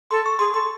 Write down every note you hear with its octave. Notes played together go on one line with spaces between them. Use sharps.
A4 C6
C#6
G#4 C6
A4 C6